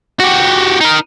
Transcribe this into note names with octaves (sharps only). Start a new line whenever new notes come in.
F#4 G4
D#4 A#4